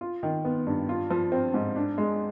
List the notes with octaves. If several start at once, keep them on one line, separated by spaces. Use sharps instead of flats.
F4
D#3
B3
G2
F4
F3
C4
G#2
D4
G#3